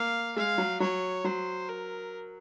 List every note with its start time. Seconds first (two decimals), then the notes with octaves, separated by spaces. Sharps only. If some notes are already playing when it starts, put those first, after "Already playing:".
Already playing: A#3 F5
0.36 G#3 F5
0.58 F#3
0.80 F#3 C#5
1.24 F#3 C5
1.69 A#4